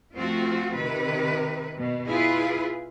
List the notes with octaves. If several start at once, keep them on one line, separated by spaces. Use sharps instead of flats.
F3 A3 C4 F4 F#4
C3 D#3 B4
B2
E4 F4 G#4 B4